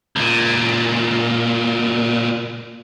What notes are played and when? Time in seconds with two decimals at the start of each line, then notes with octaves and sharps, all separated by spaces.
0.16 C#2 A#2